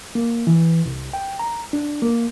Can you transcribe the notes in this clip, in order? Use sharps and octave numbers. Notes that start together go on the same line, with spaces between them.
A#3
E3
C2
G5
A#5
D4
A#3